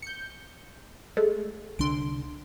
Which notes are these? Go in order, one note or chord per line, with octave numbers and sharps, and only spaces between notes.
G6 C#7
G#3 A3
C2 D3 D4 C6 D7